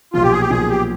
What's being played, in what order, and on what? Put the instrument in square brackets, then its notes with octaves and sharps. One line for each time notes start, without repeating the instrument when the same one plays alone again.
[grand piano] B1 A#2 F3 [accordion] F4
[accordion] G4
G#4
G4
[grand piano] B1 A#2 F3 [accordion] G#4
[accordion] G4